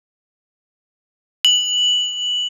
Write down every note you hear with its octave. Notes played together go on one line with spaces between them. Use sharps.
F#7